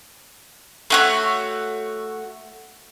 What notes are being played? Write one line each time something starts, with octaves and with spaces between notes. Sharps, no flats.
A3 F#4 C#5